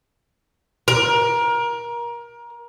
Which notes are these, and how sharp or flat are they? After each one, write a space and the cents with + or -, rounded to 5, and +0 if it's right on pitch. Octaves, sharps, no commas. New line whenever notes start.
A#4 +25